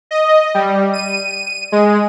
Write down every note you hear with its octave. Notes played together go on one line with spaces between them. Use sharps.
D#5
G3
D#7
G#3